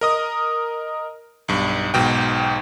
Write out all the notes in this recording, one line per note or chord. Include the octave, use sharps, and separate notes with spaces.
A#4 D#5 D#6
B1 G2
B1 G#2 B2 G5